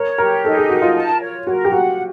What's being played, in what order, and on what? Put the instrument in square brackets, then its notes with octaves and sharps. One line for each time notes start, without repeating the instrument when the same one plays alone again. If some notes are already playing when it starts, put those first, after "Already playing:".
Already playing: [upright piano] A#4 [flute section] C#5
[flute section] G4 [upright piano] A#4
[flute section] D#4 [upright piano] A4
[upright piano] G#4
[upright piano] F#4 [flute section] A#4
[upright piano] F4
[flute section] A5
C#5
[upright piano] F#4 [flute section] A#4
[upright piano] G4
[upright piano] F#4 [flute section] F#5